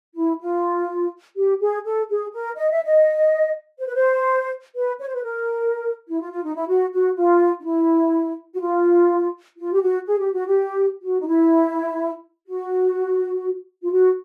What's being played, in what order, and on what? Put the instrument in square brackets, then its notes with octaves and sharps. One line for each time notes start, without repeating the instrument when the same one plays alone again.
[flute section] E4
F4
G4
G#4
A4
G#4
A#4
D#5
E5
D#5
C5
B4
C5
B4
C#5
C5
B4
A#4
E4
F4
F4
D#4
E4
F#4
F#4
F4
D#4
E4
F#4
F4
F4
G4
F#4
G#4
G4
F#4
G4
F#4
D#4
E4
F#4
F4
F#4